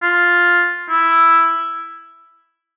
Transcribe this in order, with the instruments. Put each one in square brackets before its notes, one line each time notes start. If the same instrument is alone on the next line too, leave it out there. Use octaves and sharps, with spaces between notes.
[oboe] F4
E4